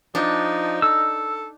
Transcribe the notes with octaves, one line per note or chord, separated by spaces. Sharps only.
F3 D4 D#4
A4 E6